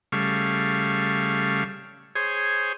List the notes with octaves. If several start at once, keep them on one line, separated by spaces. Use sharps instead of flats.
C#3 G3 A3 F5 C#6
G#4 C5 C#5